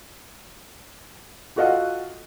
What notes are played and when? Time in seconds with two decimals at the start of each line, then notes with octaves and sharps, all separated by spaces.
1.56 F4 F#4 A4 D#5 F5 F#5